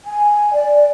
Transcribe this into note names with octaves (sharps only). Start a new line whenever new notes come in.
G#5
D5